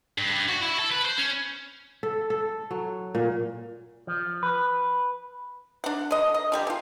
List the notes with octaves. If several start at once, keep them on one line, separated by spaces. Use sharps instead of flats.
G2
G2
F#4
E4
A4
B4
C5
C#4
A4
A4
F#3
A#2
F3
B4
D4 F#5
D3 D#5
D#5
D3 G3 G4
E3 F4